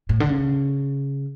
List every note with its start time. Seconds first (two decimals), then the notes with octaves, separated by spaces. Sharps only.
0.09 A2
0.20 D3
0.29 C#3